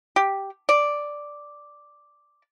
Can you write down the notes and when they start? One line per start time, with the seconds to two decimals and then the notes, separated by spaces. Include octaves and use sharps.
0.16 G4
0.69 D5